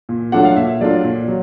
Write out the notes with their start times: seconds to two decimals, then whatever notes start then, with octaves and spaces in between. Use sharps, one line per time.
0.09 A#2
0.32 F#3 A3 D4 F4 F#5
0.45 F5
0.56 A#2 E5
0.80 F#3 A3 D4 F4 D5
1.04 A#2
1.28 F#3